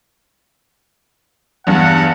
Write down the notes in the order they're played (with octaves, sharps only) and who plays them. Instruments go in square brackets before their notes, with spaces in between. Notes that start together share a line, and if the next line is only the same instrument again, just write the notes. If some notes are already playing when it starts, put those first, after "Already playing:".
[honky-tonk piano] E2 G2 [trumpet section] F#5